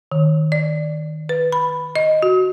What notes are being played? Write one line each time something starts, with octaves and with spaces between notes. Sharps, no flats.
D#3
D5
B4
B5
D#5
F#4